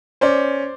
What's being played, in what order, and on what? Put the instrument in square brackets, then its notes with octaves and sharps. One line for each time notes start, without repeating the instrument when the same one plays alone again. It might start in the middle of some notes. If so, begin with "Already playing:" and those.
[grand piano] C#4 [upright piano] C5 D5